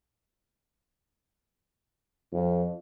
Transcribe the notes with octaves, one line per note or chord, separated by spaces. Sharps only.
F2